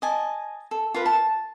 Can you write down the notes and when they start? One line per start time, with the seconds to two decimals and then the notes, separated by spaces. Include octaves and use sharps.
0.02 D#5 G#5 A5
0.71 A4
0.94 F4 A#4 B4
1.06 A5